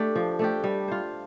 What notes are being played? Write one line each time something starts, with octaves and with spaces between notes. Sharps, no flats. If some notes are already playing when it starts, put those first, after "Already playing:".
Already playing: A3 D4 G4 A4
F3
A3 D4 G4
G3
F4 C5